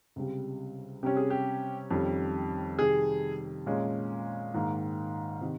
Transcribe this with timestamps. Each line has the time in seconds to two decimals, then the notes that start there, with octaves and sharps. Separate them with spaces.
0.16 C#2 C3 G3
1.03 C3 G3 C#4 G4
1.17 G#4
1.30 G4
1.91 F2 D#3 G3 C#4
2.79 C3 D#3 G3 G#4
3.66 A#2 G#3 C#4
4.54 G#2 D#3 A#3
5.41 C3 D#3